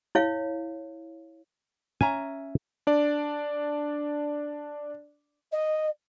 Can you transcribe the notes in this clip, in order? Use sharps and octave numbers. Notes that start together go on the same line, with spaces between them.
E4 C#5 F5
C#4 E5 G#5 A#5
D4 D5
D#5